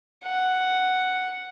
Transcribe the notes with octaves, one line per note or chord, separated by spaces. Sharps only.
F#5